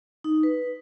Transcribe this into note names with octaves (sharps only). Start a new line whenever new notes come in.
D#4
B4